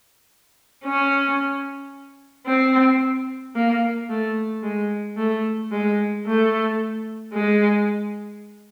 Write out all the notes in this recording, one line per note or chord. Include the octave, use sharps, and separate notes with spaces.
C#4
C4
A#3
A3
G#3
A3
G#3
A3
G#3